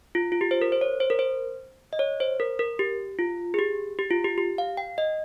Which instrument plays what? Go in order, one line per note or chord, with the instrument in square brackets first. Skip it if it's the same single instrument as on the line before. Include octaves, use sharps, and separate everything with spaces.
[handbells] F4
F4
G4
C5
A#4
C5
C#5
C5
A#4
C5
D#5
C#5
C5
A#4
A#4
G4
F4
G#4
G4
G4
F4
G4
G4
F5
G5
D#5